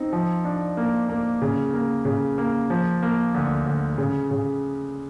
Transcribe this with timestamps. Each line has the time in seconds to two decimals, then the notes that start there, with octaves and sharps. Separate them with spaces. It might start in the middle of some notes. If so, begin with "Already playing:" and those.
Already playing: C4 D#4
0.13 F3
0.45 D4
0.77 A#3
1.09 A#3
1.42 C#3
1.73 A#3
2.05 C#3
2.38 A#3
2.70 F3
3.02 A#3
3.34 D2
3.67 D2
3.98 C#3
4.31 C#3